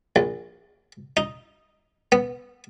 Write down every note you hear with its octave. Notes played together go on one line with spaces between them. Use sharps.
A#1
D#4
B3